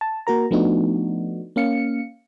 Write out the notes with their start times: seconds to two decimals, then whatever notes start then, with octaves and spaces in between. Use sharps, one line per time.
0.01 A5
0.27 A#3 F#4 A#4 A#5
0.51 F3 A3 B3 D4 D#4 F#4
1.56 A#3 C#4 F5 C#7